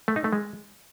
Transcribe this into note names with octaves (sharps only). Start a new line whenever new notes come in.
A3
D#4
A3
G#3